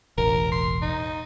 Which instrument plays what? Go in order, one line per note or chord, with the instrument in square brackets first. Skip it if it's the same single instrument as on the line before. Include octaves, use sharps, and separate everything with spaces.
[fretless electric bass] E1 A1 [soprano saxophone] A#4
[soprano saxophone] C6
D#4